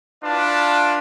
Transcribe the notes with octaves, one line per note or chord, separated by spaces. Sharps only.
D4 E4 F4 B4 D5 A5